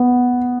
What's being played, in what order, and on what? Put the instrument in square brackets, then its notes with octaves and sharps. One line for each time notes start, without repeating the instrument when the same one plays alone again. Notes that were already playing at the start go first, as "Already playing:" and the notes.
Already playing: [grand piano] B3